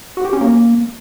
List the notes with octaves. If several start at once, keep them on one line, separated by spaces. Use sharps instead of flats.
F#4
G4
C#4
A#3